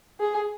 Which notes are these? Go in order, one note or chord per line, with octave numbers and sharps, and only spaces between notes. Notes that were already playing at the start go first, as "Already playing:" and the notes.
G#4